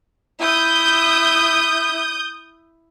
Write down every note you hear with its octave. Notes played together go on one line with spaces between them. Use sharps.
E4 D#6 G6